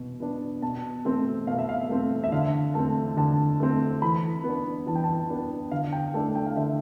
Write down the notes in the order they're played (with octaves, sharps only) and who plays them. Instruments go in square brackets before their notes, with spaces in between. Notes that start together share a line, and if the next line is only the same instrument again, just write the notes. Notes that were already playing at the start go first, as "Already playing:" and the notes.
Already playing: [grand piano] B2 B3
B3 D4
B2 A5
A3 C4
B2 F5
E5
F5
A3 C4
E5
D3 F5
A3 C4 A5
D3 A5
A3 C4
E3 B5
B3
D4
E3 A5
G5
A5
B3 D4
D3 F5
G5
A3 D4 A5
G5
F5
D3 E5